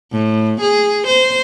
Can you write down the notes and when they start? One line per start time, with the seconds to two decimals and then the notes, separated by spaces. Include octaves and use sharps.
0.12 A2
0.61 G#4
1.07 C5